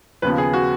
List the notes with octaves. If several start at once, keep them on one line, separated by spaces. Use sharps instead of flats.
D#2 C#3 F3 B3 B4
G#4
F#4